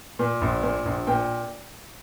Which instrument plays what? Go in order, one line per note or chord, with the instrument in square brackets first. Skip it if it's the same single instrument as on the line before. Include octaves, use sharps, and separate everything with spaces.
[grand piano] A#2
A#1
A#2
A#1
A#2 G5